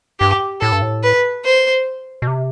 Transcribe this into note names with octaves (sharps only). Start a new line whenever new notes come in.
G2 G4
A2 A4
G2
A2
B4
C5
B2
C3